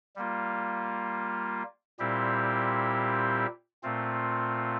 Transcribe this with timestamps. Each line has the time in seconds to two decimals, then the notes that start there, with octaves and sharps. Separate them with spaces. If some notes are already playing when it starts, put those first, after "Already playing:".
0.16 G3 A#3 F4
1.99 A#2 G3 C4 E4 G4
3.83 A#2 A3 C4 F4